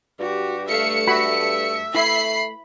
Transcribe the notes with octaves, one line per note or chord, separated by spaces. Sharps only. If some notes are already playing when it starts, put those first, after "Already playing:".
G2 F#4 G4
A3 E5 F5 C#7
F#4 E5 B5
A3 E4 B5 C7